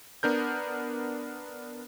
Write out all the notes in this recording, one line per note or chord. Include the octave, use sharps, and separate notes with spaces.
B3 D4 A#4 G6